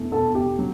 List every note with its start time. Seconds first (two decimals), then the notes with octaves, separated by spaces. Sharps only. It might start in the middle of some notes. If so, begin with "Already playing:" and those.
Already playing: E2 B2 A3
0.12 B2 A4
0.35 B2 G4
0.59 F#3